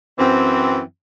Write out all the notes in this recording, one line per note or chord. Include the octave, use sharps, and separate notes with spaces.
F#2 E3 C4